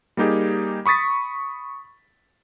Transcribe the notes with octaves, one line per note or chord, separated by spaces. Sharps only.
G3 A#3 D#4 G4 G#4
B5 C#6 D#6 A6 B6